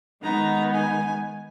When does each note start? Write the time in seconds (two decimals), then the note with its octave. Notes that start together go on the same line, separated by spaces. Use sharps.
0.23 D#3 G#3 B3 D#4 A#5
0.75 G#5